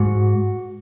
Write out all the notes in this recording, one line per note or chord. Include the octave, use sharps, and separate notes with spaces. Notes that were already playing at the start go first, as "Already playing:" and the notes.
Already playing: G#2 F#4